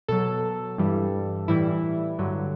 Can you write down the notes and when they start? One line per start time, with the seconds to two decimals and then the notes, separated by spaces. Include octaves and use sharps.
0.08 B2 F#3 A4
0.78 G2 E3 G3
1.48 A2 E3 G3 E4
2.19 G2 D3 F#3